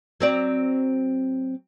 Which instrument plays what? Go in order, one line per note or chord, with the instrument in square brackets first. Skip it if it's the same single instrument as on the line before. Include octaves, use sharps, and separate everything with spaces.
[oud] F#3 C4 D5